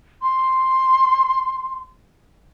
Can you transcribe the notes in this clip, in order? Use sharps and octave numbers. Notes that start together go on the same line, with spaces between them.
C6